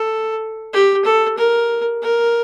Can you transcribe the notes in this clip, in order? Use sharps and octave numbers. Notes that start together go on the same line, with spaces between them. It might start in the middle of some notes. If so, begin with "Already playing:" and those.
Already playing: A4
G4
A4
A#4
A#4